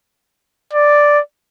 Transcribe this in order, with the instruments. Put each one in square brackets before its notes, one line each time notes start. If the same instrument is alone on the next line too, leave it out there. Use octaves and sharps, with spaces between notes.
[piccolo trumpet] D5